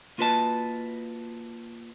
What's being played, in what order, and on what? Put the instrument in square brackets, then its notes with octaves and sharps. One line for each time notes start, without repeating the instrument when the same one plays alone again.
[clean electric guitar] A#3 F4 F#4 B4 D#5 A5